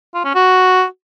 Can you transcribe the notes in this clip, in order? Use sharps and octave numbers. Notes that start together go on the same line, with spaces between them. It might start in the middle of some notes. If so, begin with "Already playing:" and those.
F4
C#4
F#4